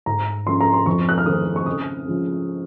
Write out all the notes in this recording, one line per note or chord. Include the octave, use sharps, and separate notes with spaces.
G#2 A#5
F3 G#3 C#4 C6
A#5
C6
F2 C#6
F#6
F6
D#3 G#3 C4 D#6
C#6
C#3 D#6
F3 G#3 C#4